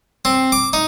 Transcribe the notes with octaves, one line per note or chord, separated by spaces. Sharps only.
C4
D6
D#4